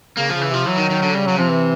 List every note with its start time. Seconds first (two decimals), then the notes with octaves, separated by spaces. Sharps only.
0.17 C#3 A#3
0.29 C#3 F3
0.42 E3
0.50 C3 F3
0.66 E3 F#3
0.77 D#3
0.90 D#3
1.03 D3
1.14 C#3 G3
1.26 C#3 F#3
1.38 C3 F3
1.50 E3